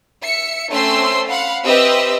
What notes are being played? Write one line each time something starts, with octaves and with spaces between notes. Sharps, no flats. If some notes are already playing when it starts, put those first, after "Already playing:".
E5 C#7
A3 C4 C#4 C5 C6 E6
F5 F#5 B5
C4 G4 B4 D#5 E5 E6